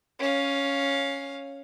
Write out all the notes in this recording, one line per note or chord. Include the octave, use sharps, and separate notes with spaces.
C#4 F5